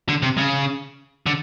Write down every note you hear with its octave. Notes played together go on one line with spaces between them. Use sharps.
D3
C3
C#3
D3